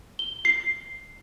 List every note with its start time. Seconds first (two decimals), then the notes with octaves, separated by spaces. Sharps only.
0.19 G7
0.45 C7